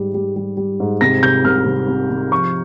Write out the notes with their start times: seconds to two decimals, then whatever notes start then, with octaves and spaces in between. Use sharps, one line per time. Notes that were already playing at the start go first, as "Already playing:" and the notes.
Already playing: G#2 G3
0.14 G3
0.36 G3
0.57 G3
0.80 G#2
1.01 C3 A#6
1.22 C3 G6
1.45 C2 F6
1.66 C2
1.88 C3
2.10 C3
2.31 F3 C#6